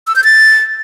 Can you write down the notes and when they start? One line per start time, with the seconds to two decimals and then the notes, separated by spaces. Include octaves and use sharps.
0.07 E6
0.16 G6
0.24 A6